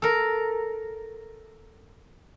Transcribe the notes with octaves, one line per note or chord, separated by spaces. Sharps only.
A4 A#4